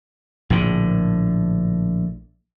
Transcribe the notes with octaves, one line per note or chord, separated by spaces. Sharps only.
A#1 A2 D3